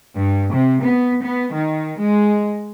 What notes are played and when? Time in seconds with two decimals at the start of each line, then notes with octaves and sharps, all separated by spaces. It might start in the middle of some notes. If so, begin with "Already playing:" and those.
0.16 G2
0.52 C3
0.83 B3
1.24 B3
1.52 D#3
1.99 G#3